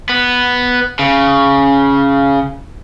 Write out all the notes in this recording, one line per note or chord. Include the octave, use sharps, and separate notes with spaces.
B3
C#3